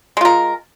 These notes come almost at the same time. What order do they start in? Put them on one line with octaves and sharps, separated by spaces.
G#3 F4 A#4